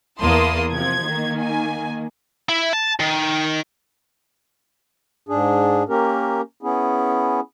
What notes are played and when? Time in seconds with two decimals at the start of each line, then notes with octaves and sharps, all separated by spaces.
0.20 E2 A#3 E4 A5 C6 D#6
0.72 C3 F3 G#6
1.04 D#3 A#3
1.38 G#5
2.49 E4
2.73 A5
3.00 D#3
5.29 G#2 D4 G#4
5.89 A#3 C#4 G4 A#4
6.63 B3 C#4 E4 G#4